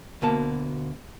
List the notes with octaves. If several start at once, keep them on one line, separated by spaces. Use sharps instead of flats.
D2 B2 A#3 A5